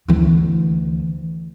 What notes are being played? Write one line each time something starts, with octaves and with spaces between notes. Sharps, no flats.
D2 E3